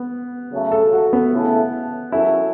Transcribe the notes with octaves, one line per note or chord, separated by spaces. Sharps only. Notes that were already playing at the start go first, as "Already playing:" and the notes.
Already playing: B3
C#3 F#3 A3
A4
F#4
B3
C#3 A3 E4 A4
F#2 C#3 F#3 C#4 E4 A4